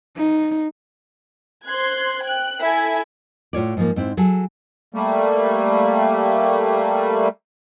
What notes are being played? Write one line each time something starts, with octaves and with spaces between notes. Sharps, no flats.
D#4
C5 C6 F#6 G#6
G5 F#6
E4 A4 G#5 G#6 B6
A2 F4 C#5 D5
G#2 F3 A#3
G#2 C4 E4
F#3 G#4 A4
G3 A3 A#3